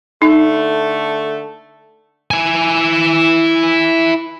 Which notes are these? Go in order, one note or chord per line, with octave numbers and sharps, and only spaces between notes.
D3 A3 D#4
E4 G#5